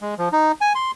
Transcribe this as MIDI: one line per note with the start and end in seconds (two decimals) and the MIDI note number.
0.02 0.14 56
0.18 0.29 53
0.33 0.52 63
0.61 0.73 80
0.75 0.91 84